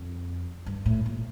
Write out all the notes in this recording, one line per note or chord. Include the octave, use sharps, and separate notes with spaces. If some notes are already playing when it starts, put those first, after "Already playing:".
Already playing: F2
G2
A2
A#2